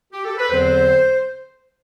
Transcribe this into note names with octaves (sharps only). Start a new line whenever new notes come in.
G4
A4
B4
E2 D3 F#3 C4 C5